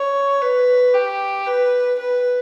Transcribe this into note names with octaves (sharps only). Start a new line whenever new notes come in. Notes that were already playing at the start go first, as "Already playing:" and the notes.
Already playing: C#5
B4
G4
B4
B4